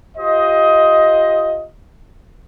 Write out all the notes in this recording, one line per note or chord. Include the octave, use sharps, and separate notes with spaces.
F4 G4 C5 D#5